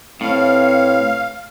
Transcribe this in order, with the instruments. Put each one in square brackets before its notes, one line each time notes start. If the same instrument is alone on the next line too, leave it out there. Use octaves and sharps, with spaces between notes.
[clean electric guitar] A2 [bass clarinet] C4 [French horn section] E4 B4 C#5 [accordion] F5